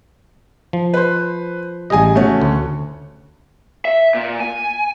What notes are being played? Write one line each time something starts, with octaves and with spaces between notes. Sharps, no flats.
F3
B4 C5
A1 G3 G#4 D#5 G#5
A3 C#4 F#4
D2
E5
A#2
G#5